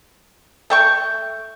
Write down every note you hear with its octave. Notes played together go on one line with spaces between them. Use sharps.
A3 G5 C#6